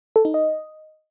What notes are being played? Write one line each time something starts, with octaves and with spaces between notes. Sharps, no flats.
A4
D#4
D#5